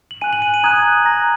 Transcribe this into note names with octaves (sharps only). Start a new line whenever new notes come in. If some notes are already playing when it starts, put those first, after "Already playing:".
F#7
G#5 F#6 D#7
F#7
D#7
D#7
A#5 D#6 F#6 G#6
A#5 F#6 A#6